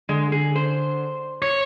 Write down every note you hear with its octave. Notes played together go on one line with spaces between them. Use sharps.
D3 G#3
G#4
C5
C#5